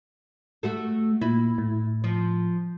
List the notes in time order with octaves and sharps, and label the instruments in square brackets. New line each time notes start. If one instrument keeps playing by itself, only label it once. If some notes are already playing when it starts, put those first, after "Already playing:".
[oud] A3 F#4 A4
[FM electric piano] A#2 [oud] E4
[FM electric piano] A2
[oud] F3